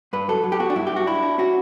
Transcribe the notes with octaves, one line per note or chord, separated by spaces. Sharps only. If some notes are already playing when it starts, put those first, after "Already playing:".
G2 B4
F#3 A4
F#3
G4
B3 F#4
D4
G2 E4
G4
G2
F#4
D4 E4
D4
C#4 F#4